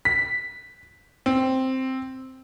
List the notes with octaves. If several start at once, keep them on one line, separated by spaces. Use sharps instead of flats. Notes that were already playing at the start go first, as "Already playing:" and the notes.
B6
C4